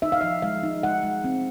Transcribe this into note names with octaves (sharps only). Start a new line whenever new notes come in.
D#4 E5
F5
F3 E5
G#3 F5
D#4
G#3 F#5
G#3
C4